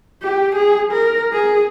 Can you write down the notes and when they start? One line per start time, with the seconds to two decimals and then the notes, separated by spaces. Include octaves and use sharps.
0.22 G4
0.56 G#4
0.92 A#4
1.33 G#4